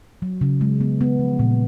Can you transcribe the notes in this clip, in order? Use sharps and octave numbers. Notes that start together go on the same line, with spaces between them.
F#3
C#3
G#3
B3
B3
F3
A#2